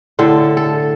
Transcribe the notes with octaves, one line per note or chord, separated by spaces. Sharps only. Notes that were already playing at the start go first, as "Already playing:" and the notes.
A2 D3 A4
A4